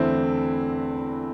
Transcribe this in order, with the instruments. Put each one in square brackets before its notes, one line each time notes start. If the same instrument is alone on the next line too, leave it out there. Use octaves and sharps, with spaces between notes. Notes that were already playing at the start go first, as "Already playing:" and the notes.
Already playing: [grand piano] E2 D3 A3 [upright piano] C4 E4